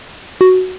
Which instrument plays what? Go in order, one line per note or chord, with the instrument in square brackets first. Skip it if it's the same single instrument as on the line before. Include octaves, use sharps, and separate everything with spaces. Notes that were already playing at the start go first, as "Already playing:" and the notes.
[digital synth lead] F#4